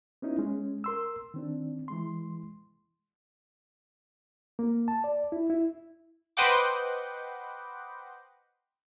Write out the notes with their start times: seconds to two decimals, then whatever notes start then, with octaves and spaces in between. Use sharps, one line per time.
0.22 B3 C#4 D#4 E4
0.39 G#3 C#4
0.84 A#4 C6 E6
1.34 D#3 C4 D4
1.88 E3 G#3 C6
4.59 A#3
4.88 A5
5.04 D5
5.32 E4
5.50 E4
6.37 B4 C5 D#5 F#5 G5 D6